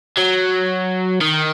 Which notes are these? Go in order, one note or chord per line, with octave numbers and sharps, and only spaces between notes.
F#3
D#3